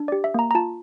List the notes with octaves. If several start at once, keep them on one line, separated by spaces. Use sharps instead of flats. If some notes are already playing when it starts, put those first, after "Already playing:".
Already playing: D4
G4 D5
E5
A#3 A#5
A#5
F4 A5